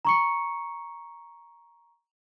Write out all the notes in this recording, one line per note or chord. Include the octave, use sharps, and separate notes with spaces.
A#5 C#6 C#7